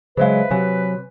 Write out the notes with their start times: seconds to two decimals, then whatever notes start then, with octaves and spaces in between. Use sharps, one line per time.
0.17 C#3 F#3 G#3 B4 C5 E5 F5
0.51 C3 F#3 G#5